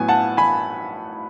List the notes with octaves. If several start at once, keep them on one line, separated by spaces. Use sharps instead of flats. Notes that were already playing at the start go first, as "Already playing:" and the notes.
Already playing: A2 F#3 B3 G#5
F#5 A5
G#5 B5